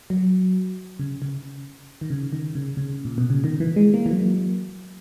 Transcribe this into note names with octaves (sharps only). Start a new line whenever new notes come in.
F#3
C#3
C#3
D#3
C#3
D#3
C#3
C#3
A#2
B2
C#3
D#3
E3
G#3
A#3
E3
F#3